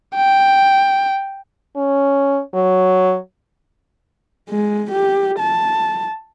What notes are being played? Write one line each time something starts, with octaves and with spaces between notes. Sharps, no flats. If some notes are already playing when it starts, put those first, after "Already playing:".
G5
C#4
F#3
G#3
G4
A5